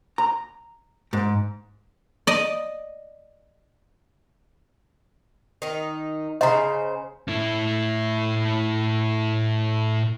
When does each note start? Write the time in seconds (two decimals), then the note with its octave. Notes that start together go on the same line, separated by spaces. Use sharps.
0.18 A#5
1.13 G#2
2.27 D5 D#5
5.62 D#3 D#4
6.41 C#3 C5 D#5 A#5
7.28 A2 E4